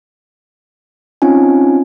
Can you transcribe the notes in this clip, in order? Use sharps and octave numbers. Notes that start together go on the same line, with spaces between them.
C4 C#4 D#4 F4 G#5